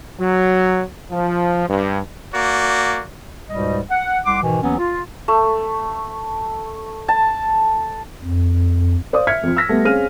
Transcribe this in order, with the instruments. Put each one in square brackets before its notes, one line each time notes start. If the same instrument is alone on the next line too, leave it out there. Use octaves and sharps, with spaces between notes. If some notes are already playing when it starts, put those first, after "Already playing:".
[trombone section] F#3
F3
G2
[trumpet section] A#3 F#4 D5
[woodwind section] C#2 G#2 B2 G3 D#5
F#5
C2 F#5 C6 D6
G#2 B2 D#3 E3
D#2 E3 F#3 B3 C#4
F4
[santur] A3
A5
[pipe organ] F2
[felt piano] C5 D5 F5 D#6
E5 F6 G#6 B6 C#7
F2 F3
E6 F6 A#6 B6
G3 A3 B3
C4 C#4 G#4 F5 F6 D#7